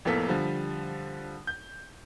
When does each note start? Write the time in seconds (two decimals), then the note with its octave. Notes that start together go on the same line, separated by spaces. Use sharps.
0.05 F1 A2 A#3 B3 A4 B6
0.28 D3 F3 G3
1.47 G6